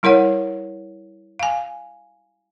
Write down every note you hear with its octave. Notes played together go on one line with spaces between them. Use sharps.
G3 E4 A#4 C#5 F#5
F5 G#5